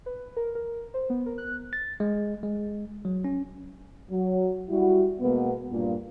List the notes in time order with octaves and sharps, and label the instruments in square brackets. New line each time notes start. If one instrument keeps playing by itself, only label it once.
[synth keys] B4
A#4
A#4
C5
B3
A#4
F#6
[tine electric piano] A6
G#3
G#3
F#3
C#4
[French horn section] F#3
G3 E4 F#4
B2 G#3 A#3 B3
G2 A#2 A#3